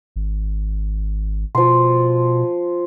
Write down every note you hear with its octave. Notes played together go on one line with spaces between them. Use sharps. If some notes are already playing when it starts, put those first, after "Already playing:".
G#1
B2 F3 C6